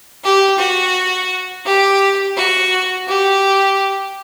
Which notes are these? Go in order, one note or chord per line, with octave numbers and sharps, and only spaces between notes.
G4
F#4
G4
F#4
G4